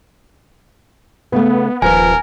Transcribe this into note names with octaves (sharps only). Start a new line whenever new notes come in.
C#3 A3 B3
D#1 F3 A#4 B4 G#5